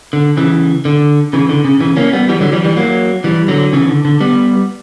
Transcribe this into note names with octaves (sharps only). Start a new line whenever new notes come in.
D3
C#3 E3
D3
C#3 E3
D3
C#3
C#3 E3
A#3 C#4
G3 B3
E3 G3
D3 F#3
E3 G3
E3 G3
F#3 A#3
E3 G3
D3 F#3
C#3 E3
D3
D3
G3 B3